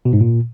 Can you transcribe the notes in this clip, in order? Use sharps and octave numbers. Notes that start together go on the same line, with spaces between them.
B2
G#2
A#2